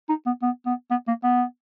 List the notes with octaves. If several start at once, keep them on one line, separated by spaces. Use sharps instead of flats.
D#4
B3
B3
B3
B3
A#3
B3